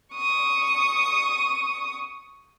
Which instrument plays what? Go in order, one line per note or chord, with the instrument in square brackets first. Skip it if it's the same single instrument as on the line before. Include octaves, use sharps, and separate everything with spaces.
[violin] C#6 D#6